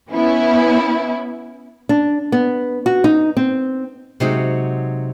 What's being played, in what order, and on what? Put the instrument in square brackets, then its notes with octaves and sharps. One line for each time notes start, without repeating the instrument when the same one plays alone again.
[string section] B3 C#4 E4
[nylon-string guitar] D4
B3
F#4
D#4
C4
C3 F#3 G#3 C4 D#4 F#4